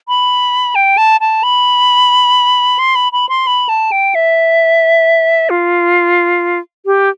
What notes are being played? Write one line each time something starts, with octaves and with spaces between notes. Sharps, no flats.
B5
G5
A5
A5
B5
C6
B5
B5
C6
B5
A5
G5
E5
F4
G4